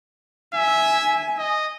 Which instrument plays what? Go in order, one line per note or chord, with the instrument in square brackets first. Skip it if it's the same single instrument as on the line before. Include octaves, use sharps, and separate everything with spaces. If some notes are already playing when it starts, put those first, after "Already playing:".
[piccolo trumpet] E5 [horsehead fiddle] G#5
[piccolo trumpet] D#5